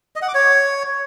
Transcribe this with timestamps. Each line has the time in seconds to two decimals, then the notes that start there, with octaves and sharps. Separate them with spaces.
0.16 D#5
0.22 F#5
0.28 D6
0.34 C#5